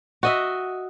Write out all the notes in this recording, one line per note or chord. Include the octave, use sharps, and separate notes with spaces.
F#4 D#5 E5